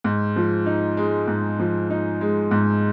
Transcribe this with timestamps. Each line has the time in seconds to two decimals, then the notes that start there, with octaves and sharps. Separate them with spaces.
0.04 G#2
0.36 F3
0.66 D#4
0.97 G#3
1.28 G#2
1.59 F3
1.90 D#4
2.21 G#3
2.51 G#2